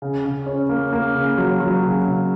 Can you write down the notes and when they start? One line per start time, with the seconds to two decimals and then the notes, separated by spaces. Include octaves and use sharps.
0.02 C#3
0.25 C#3
0.47 C#4
0.69 A#3
0.93 A#3
1.15 C#3
1.38 F#3
1.60 F#3
1.83 C#3
2.05 C#3